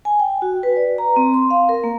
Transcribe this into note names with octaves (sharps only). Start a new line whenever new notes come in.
G#5
G5
F#4
B4
D5
A#5
C4
C6
F5
A#4
A#3